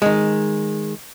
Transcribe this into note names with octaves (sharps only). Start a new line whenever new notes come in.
D#3 G#3